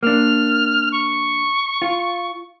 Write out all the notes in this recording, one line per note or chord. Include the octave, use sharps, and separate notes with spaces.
A#3 D4 F6
C#6
F4